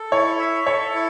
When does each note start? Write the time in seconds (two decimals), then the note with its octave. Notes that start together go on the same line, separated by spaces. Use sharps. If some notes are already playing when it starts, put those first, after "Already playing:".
Already playing: A4
0.12 E4 C#5
0.39 E5
0.66 A4 C#5
0.94 E4